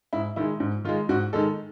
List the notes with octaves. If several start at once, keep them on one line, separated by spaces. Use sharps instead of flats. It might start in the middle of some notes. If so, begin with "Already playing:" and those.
G#2 E4
D#3 G#3 E4
G#2
D#3 G#3 F4
G#2 F#4
D#3 G#3 A4